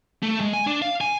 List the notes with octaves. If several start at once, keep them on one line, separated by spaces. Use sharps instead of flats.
A3
G#3
G#5
D4
F5
G#5